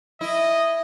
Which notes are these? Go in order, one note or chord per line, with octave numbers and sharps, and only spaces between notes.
E4 D#5